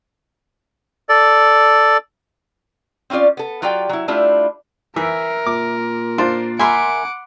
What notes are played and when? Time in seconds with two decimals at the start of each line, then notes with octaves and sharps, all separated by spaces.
1.09 A4 D5
3.10 C4 C#4 E4 F4 D5
3.37 B3 A4
3.62 F#3 F4 G4 D5 G5
3.89 F#3 E4
4.08 G3 A3 D4 E4 F4
4.96 E3 A#4 E5
5.46 A#2 D6
6.18 D4 F4 C5
6.59 A#4 E5 F#5 G#5 B5 C6 D6